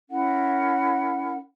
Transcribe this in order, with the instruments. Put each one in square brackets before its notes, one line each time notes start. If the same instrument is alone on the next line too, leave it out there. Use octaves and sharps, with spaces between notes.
[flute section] C#4 E4 A#4 F#5